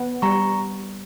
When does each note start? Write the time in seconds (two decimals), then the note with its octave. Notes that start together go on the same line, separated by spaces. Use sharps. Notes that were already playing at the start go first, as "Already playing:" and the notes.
Already playing: B3
0.22 G3 A#5 C#6